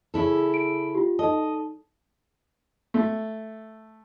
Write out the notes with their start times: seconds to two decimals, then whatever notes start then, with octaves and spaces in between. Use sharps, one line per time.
0.14 C#3 E4 A4
0.54 D7
0.95 F4 G4
1.19 D#4 A4 D#5 A5
2.94 A3